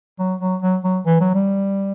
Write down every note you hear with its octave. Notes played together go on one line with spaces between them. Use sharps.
F#3
F#3
F#3
F#3
E3
F#3
G3